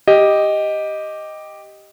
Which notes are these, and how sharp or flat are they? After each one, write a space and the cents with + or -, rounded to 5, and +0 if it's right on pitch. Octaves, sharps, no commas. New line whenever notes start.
G4 +0 D#5 +0